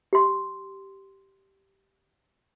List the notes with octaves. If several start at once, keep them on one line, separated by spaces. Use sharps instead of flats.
G4 C6